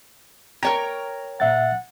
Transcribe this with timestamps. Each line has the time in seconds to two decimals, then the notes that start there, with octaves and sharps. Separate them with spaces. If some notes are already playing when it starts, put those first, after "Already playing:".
0.63 A#4 C#5 G5 A#5
1.40 A#2 E5 F#5 A6